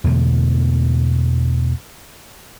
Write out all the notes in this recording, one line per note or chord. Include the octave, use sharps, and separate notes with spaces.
E2 B2 D3 A3